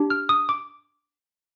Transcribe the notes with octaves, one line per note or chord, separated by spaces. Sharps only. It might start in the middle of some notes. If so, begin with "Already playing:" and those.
Already playing: D4 G4
F6
D#6
D6